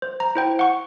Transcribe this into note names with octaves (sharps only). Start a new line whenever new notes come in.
C5
A#5
E4 C5 G5
F#5 C#6